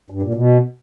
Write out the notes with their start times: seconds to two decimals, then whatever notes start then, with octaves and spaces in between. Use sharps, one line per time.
0.10 G2
0.22 A#2
0.34 B2